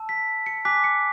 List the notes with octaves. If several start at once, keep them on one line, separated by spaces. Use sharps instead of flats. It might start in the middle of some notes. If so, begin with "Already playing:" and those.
Already playing: A5 E6
B6
C#7
G#5 D6 F#6 B6
C#7